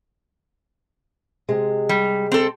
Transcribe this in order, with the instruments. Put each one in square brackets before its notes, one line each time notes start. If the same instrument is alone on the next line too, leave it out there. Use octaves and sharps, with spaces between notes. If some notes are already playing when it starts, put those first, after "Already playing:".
[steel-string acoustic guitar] C3 G#3
[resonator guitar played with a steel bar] G3
C4 A4